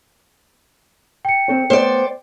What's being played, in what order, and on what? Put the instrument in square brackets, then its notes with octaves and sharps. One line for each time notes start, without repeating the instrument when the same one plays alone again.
[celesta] G5 C#7
[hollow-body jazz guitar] C4 A4 C#5
[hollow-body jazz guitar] A3 B3 [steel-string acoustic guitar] C5 D5